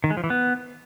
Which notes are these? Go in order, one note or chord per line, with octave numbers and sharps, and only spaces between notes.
D#3
G#3
F3
E3
B3